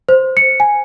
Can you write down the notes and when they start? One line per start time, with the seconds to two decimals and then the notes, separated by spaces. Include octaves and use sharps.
0.09 C5
0.37 C#7
0.60 G#5